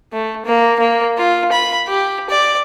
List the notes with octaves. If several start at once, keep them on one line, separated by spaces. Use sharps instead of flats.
A3
A#3
A#3
F4
B5
G4
D5